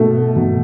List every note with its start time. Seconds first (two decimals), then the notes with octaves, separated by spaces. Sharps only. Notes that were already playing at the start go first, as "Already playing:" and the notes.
Already playing: B2 A3
0.36 B2